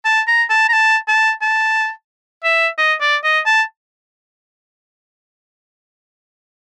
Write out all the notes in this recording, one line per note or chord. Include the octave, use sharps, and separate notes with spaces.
A5
A#5
A5
A#5
A5
A5
A5
E5
D#5
D5
D#5
A5